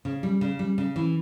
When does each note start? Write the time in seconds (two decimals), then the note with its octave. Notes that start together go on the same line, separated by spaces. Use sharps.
0.05 C#3
0.23 G3
0.41 C#3
0.59 G3
0.78 C#3
0.96 E3